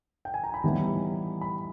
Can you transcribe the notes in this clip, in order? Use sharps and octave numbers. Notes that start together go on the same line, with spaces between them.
G5
G#5
A#5
B5
A2 E3 G3 B3 D#4
B5